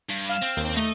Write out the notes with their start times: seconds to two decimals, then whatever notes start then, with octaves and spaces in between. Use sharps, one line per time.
0.10 G2
0.29 F5 F6 E7
0.43 C4
0.57 D#2
0.77 A3 D#4 D#5